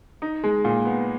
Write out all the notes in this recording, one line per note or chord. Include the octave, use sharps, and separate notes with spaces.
D#4
G#3
A#2
B3